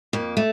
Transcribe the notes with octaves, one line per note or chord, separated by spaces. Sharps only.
F2 A#3
A3